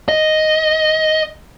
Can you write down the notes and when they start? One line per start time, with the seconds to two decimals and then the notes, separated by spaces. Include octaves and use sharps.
0.08 D#5